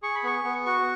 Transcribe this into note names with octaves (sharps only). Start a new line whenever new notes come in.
G#4 C#6
B5
B3 C#6
B3
F#4 C#6